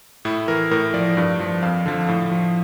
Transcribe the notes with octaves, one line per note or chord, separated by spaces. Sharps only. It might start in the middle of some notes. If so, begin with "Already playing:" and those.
A2 E4
E3 A#4
A2 A#4
F3 D5
G2
F3
F2 F5
D3 F3
A2
F3